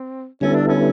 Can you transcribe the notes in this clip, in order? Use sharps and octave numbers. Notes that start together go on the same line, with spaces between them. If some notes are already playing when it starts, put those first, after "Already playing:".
Already playing: C4
D3 G3 B3 C#4 E4 A4
D4
C#4